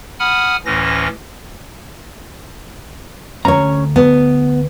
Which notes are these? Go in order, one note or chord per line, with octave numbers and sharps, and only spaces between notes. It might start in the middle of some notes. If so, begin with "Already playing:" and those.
F#5 G#5 B5 D#6 F6
D2 A2 E3 C#4 A#6
D2 C#4 C#5 A#5
B3